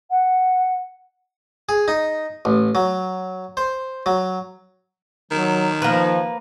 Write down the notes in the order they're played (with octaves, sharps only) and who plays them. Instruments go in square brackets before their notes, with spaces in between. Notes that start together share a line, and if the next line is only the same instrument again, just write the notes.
[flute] F#5
[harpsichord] G#4
D#4
A1
F#3
C5
F#3
[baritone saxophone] D#3 [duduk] F#3
[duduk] F3 [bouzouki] A#3 B4